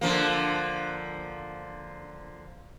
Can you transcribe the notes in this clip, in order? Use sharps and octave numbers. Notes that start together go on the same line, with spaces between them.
D3 F3 A#3